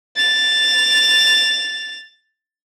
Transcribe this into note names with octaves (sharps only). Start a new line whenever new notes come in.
A6 F7